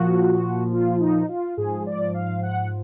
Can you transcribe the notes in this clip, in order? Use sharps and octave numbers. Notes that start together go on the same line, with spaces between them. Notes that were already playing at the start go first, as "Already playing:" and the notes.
Already playing: A#2 F3 F#4
F4
D#4
F4
G#2 F3 G#4
D5
F5
F#5